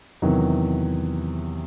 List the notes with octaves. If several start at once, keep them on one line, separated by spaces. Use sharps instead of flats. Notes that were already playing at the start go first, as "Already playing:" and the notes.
E2 C3 D#3 F#3